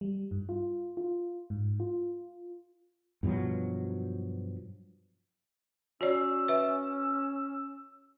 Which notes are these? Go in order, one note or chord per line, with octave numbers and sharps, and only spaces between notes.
G3
G2
F4
F4
G#2
F4
G2 B2 F3 F#3
C#4 F#4 C#5 D5 E6
B4 E5